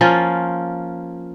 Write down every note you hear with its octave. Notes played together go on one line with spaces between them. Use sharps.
F3 A#3 C#4 F4